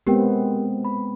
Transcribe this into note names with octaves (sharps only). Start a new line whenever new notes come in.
G#3 B3 C4 G4 A#4 G5
B5